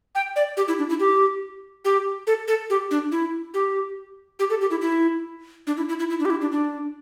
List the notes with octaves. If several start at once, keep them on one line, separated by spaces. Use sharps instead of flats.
G5
D5
G4
E4
D4
E4
G4
G4
A4
A4
G4
D4
E4
G4
G4
A4
G4
E4
E4
D4
E4
E4
E4
E4
D4
G4
E4
D4
D4